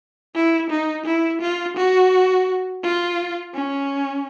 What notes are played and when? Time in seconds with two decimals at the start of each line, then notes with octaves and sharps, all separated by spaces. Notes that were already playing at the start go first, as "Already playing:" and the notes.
0.35 E4
0.70 D#4
1.06 E4
1.41 F4
1.77 F#4
2.83 F4
3.54 C#4